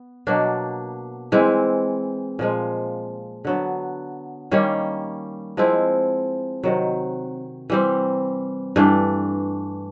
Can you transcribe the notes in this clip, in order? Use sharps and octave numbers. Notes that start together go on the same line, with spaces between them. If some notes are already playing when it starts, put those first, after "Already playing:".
Already playing: B3
B2 F#3 A#3 D4
E3 G#3 C4 E4
A#2 F3 G#3
D3 F#3 B3
D#3 G3 A#3 C#4
F3 G#3 C4 E4
C3 D#3 F#3
E3 G3 C4
G2 E3 A3 D4